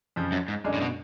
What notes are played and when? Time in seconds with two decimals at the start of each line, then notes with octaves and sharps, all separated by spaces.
0.16 F2 C#3 F3
0.32 F#2
0.48 G#2
0.64 F#2 D3 G#3 D4
0.74 A2
0.81 B2